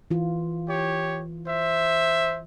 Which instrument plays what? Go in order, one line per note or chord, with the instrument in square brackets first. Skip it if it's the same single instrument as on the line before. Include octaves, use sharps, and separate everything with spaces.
[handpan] E3 F4
[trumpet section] G4 C#5
C5 E5